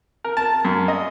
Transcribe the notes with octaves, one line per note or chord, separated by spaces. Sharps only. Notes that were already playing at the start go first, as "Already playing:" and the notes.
A#4
A5
F#2
D#5